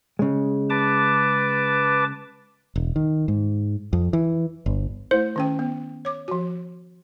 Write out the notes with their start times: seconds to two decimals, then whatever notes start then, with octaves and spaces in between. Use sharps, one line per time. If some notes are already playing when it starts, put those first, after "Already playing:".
0.19 C#3 G#3
0.70 B4 A5 D6
2.76 E1
2.96 D#3
3.28 G#2
3.93 F2
4.13 E3
4.66 G1
5.11 A3 E4 C5
5.36 D#3 C#4 G5
5.59 B3
6.05 C#5 D6
6.28 F3 F#4